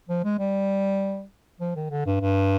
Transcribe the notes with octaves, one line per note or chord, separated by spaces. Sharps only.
F3
G#3
G3
F3
D#3
D3
G2
G2